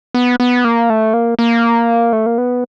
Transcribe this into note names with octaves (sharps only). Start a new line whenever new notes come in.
B3
B3
A#3
A3
A#3
A#3
A3
A#3
B3